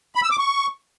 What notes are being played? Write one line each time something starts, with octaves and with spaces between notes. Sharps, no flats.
B5
E6
D6
C#6